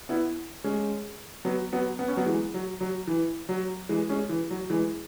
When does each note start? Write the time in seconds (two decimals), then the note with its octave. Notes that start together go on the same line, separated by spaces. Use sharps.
0.09 B3 E4
0.64 G#3 C#4
1.45 F#3 B3
1.72 F#3 B3
1.99 B3
2.08 C#4
2.17 F#3 B3
2.26 E3 G#3
2.54 F#3
2.80 F#3
3.07 E3
3.49 F#3
3.89 E3 G#3
4.09 G#3 C#4
4.29 E3
4.50 F#3
4.70 E3 G#3